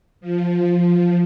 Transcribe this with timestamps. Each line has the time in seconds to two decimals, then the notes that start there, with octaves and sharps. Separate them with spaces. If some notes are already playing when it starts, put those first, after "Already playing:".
0.21 F3